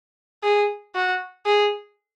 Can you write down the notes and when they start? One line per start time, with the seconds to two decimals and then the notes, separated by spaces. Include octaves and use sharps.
0.43 G#4
0.95 F#4
1.46 G#4